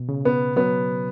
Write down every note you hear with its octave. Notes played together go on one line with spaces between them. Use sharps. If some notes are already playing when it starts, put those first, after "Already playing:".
Already playing: B2
C#3
B3
F#3 B3